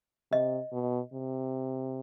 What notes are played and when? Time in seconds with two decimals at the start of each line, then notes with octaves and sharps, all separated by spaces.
0.31 C3 D#5
0.72 B2
1.13 C3